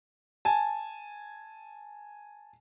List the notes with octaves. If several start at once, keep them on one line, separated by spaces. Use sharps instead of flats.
G#5 A5